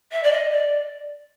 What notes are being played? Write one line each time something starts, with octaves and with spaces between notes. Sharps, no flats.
E5
D5
D#5
D5